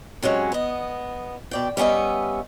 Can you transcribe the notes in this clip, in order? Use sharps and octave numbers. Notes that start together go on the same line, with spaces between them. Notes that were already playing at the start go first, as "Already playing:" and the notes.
C3 F#3 G#3 C#4
B3 D#5
B2 D5 G5
G3 B3 C#4 D#5 E5